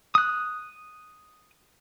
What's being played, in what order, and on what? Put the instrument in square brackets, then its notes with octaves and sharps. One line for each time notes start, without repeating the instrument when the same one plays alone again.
[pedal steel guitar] D#6 F#6